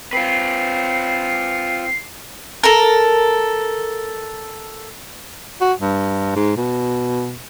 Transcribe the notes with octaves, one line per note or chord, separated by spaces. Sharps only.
C4 F4 B4 C7
A4 A#4
F#4
G2
G#2
B2